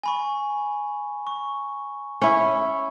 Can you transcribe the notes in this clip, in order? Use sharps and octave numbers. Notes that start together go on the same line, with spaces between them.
G#5 B5 C#6
C#6
C#4 E4